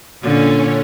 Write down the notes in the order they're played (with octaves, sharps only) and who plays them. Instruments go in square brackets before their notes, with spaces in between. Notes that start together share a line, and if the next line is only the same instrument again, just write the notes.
[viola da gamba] A#2 D3 [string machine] C#4